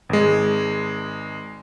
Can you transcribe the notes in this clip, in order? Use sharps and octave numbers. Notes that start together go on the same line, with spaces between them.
G#1 G#3